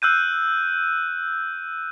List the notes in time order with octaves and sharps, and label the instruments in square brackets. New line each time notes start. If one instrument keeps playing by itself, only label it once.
[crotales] E6 F#6 G6 D#7